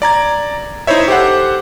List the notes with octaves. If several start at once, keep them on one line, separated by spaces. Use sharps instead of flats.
D5 A#5 G#6
D#4 E4 C5 C#5 E5
G4 A4 C5 F#5